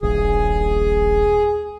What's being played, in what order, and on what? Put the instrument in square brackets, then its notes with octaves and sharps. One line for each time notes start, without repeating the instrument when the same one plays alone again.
[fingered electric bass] D#1 A#1 [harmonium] G#4